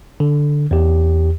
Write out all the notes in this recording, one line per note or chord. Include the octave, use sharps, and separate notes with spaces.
D3
E2 G4